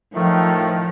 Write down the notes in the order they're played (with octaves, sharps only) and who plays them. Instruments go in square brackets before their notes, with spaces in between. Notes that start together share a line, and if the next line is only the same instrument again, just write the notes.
[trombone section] A2 D#3 A3 [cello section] F3